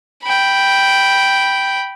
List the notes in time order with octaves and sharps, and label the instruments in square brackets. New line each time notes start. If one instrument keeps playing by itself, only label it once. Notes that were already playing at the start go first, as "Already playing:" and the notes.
[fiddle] G5 B5